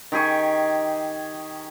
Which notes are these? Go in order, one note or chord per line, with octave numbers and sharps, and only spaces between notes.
D#3 G4 G#4 C#6